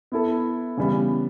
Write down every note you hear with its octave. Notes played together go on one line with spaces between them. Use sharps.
B3 E4 A4
C#3 E3 G3 B3